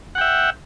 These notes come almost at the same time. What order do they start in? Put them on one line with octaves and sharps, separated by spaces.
F#5 G5 E5